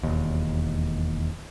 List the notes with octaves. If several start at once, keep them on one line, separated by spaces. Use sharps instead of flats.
E1 D#2